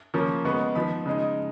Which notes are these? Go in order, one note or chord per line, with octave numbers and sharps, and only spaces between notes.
C#3 F3 A#3 C#4
C#3 G#3 B3 C#6
F3 B3 D#4 B5
C#3 G#3 D#4